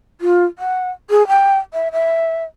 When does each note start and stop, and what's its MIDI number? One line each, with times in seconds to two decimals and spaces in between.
0.21 0.44 65
0.59 0.90 78
1.10 1.26 68
1.28 1.58 79
1.73 1.88 76
1.92 2.43 76